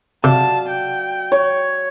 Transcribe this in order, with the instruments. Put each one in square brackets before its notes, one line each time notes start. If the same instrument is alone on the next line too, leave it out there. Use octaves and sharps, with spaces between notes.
[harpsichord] C3 [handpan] F#4 D5 F5 [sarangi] A5
[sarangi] G5
[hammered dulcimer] C#5